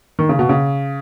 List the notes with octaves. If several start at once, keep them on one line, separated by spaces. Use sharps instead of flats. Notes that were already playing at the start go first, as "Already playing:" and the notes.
D#3
C#3
B2
C#3